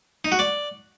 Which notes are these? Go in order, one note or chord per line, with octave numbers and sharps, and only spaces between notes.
D#4
F#4
D5